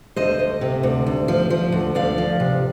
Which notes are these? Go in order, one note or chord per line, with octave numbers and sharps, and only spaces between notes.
D2 C5 D#5
D2
C3
D2
D2
F3
F3
D2
D2 D5 F5
F3
C3